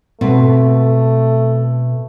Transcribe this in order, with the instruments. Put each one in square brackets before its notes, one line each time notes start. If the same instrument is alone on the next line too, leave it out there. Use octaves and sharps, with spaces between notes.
[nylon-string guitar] B2 C4 B4 [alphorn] A3